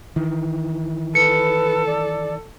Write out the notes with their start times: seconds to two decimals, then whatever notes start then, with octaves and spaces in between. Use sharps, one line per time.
0.16 D#3 E3
1.15 A4 B4 C#7
1.87 D5